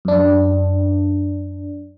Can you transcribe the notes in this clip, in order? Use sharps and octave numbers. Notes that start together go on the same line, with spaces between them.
F#2 D4